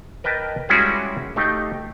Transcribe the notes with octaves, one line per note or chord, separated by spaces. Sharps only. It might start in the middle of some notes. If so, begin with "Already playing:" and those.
A#4 B4 D#5 G5 A5
G3 G#3 C#4 E4 F#4 G#4
A3 D#4 G4 F5